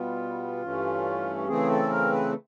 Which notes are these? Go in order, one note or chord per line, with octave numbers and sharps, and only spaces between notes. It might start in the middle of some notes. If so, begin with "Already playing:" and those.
Already playing: B2 G3 B3 F4
G2 E3 A3 C#4
C#3 E3 A3 C4 G#4
A4
A#4
B4